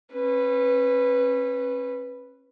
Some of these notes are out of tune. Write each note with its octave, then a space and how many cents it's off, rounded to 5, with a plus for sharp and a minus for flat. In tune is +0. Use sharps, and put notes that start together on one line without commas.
C#4 -35 B4 +0